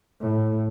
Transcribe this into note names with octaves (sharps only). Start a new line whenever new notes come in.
A2